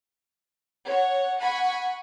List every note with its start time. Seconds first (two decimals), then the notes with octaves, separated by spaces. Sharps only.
0.87 C#5 F#5
1.39 F#5 G#5 B5 C#6